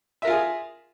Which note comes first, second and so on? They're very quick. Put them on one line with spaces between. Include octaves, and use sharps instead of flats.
E5 A#4 F4 G#5 G#4